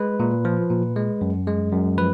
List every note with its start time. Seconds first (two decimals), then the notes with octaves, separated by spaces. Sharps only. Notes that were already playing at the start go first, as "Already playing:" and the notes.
Already playing: G#3 B4
0.20 A#2
0.45 F3
0.70 A#2
0.96 G#3
1.21 F#2
1.47 G#3
1.73 F#2
1.98 F3 B4